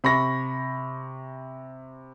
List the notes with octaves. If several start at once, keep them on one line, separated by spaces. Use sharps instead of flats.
C3 B5 C#6 A#6